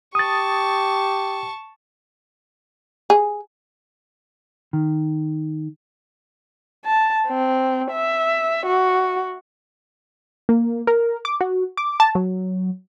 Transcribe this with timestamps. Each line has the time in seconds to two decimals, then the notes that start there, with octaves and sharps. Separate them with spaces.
0.15 G4 A5 C#6 D#6 A6
3.10 G#4
4.73 D#3
6.85 A5
7.27 C4
7.92 E5
8.66 F#4
10.49 A#3
10.87 A#4
11.25 D6
11.41 F#4
11.77 D6
12.00 A5
12.15 F#3